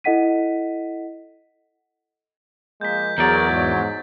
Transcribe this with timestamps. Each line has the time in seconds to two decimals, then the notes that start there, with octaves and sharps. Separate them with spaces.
0.04 E4 A4 D#5 F#5 B6 D#7
2.81 F3 G#3 A#3 G6 B6
3.18 E2 F#3 G#4 A#4 D5 G6 A6
3.50 G#2